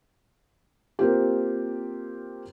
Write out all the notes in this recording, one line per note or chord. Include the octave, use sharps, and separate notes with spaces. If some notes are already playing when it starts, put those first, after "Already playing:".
A#3 C4 F4 G4